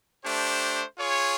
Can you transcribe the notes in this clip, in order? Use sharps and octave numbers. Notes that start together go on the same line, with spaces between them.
A3 D4 G4 C5
F4 G#4 C#5